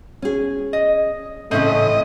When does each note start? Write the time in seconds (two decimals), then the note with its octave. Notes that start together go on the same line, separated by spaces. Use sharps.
0.22 C#4 G#4
0.73 D#5
1.51 A2 C#3 E3 A3 C4 C#4 E4 D#5